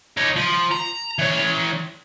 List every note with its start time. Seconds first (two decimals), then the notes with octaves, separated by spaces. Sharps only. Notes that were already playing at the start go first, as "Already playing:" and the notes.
0.17 D#4 C#5
0.36 F3
0.72 A#5
1.19 E3 C#5